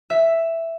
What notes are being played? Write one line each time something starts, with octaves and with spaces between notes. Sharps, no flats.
E5